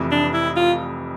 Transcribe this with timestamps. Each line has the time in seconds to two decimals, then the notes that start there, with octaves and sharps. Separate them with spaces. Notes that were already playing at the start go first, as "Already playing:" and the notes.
Already playing: F1 F2 C3 E3
0.11 D4
0.34 E4
0.56 F4